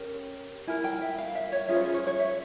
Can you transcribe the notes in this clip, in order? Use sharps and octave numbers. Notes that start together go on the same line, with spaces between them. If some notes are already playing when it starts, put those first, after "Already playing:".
Already playing: C#4 G4 A#4
E4 A#4 G#5
G5
E5
F5
E5
C#5
C#4 F4 G#4 E5
C5
C#5
C#5
C#5
E5